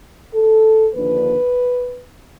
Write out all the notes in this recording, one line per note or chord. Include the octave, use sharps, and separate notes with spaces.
A4
D#2 D3 F3 A#3 D4 B4